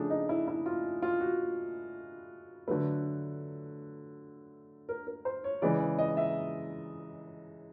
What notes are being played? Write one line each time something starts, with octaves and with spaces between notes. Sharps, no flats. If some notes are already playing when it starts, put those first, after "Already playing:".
Already playing: C#3 F3 A3 D4 G#4
D#4
E4
E4
F4
F4
F#4
D3 F#3 A3 B4
A#4
A#4
C5
C#5
C#3 E3 G#3 D5
D5
D#5
E5